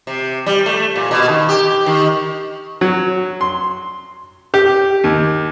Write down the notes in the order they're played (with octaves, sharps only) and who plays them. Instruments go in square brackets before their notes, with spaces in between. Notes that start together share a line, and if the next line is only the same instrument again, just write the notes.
[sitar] C3
G3
A3
A#2
B2
D#3
G4
D#3
[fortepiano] F#3
C6
G4
D#2